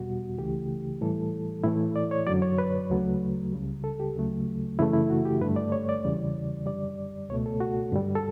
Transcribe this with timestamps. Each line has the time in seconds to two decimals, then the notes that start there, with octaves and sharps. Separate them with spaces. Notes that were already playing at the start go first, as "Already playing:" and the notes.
Already playing: E2 B2 G3 F#4
0.38 C#2 C#3 E3 A3 G4
1.01 A2 E3 G3 A4
1.64 A2 E3 A3 E4
1.96 D5
2.11 C#5
2.27 F#2 D3 F#3 D5
2.42 C#5
2.58 B4
2.90 D2 C#3 F#3 A3
3.52 C#2 C#3 G3
3.84 A4
4.00 G4
4.16 D2 C#3 F#3 A3
4.79 F#2 C#3 E3 A3 E4
4.93 E4
5.10 F#4
5.25 G4
5.41 G2 D3 A3 B4
5.56 D5
5.72 C#5
5.89 D5
6.03 E2 C#3 E3 G3
6.66 F#2 D3 G3 D5
7.29 C#2 B2 A3 C#5
7.46 A4
7.60 F#4
7.92 G2 D3 G3
8.15 A4